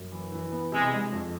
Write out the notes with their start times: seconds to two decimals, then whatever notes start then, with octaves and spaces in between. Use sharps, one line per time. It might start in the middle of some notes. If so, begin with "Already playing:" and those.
Already playing: F#2
0.12 E3
0.32 E3
0.52 B3
0.72 C3 G#3
0.93 G#3
1.12 F2